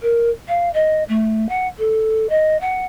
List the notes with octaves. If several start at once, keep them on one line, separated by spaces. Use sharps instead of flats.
A#4
F5
D#5
A3
F#5
A4
D#5
F#5